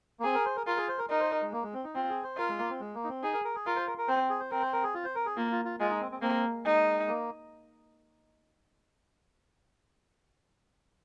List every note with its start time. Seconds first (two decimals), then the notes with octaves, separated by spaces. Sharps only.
0.20 A#3
0.24 C4 G#4
0.34 A#4
0.45 C5
0.56 A#4
0.67 F4 A#4
0.77 G#4
0.88 C5
0.99 A#4
1.09 D#4 A#4
1.20 C5
1.31 A#4
1.41 G#3
1.52 A#3
1.63 G#3
1.73 C4
1.84 D#4
1.95 C4 F4
2.09 G#4
2.23 C5
2.37 F4 A#4
2.49 G#3
2.59 A#3
2.70 C4
2.80 G#3
2.95 A#3
3.04 D#4
3.09 C4
3.23 D#4 G#4
3.34 A#4
3.45 A#4
3.55 G#4
3.66 F4 A#4
3.76 C5
3.87 A#4
3.98 A#4
4.08 C4 C5
4.30 G#4
4.40 C5
4.51 C4 A#4
4.62 C5
4.73 A#4
4.83 G#4
4.94 F4
5.04 C5
5.15 A#4
5.26 G#4
5.37 A#3 F4
5.52 F4
5.65 F4
5.80 G#3 F4
5.90 D#4
6.01 C4
6.12 C4
6.22 A#3 C4
6.65 G#3 D#4
7.08 A#3